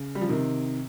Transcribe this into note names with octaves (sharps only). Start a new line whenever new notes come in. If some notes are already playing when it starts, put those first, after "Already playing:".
Already playing: C#3
G3
F3
C3 D#3